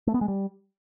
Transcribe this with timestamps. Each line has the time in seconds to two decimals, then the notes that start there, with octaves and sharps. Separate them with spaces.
0.07 A3
0.14 B3
0.21 G#3
0.28 G3